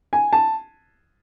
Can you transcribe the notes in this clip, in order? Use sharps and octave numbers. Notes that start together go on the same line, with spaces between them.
G#5
A5